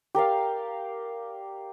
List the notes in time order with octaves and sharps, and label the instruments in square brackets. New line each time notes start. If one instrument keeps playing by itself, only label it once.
[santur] G4 A#4 D5 F5